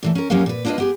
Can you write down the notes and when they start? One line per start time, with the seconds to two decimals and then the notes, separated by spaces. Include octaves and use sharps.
0.03 A#2 E3 A3
0.15 C#4 A#4
0.30 F#3 A#3 C#4 G4 A#4 F5
0.46 A#2 B4
0.65 A#3 D4 F4 A#4 B4 D#5
0.78 B3 G4 G#4